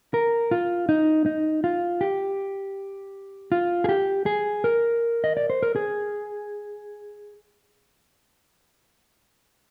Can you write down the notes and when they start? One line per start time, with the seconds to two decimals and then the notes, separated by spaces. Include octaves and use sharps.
0.14 A#4
0.51 F4
0.89 D#4
1.26 D#4
1.64 F4
2.01 G4
3.52 F4
3.84 G#4
3.89 G4
4.26 G#4
4.64 A#4
5.24 D#5
5.37 D5
5.50 C5
5.63 A#4
5.76 G#4